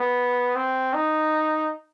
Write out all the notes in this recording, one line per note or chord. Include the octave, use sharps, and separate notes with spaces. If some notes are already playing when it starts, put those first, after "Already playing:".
Already playing: B3
C4
D#4